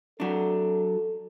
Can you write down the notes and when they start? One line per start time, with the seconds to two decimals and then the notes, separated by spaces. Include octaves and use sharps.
0.20 F#3 D4 A4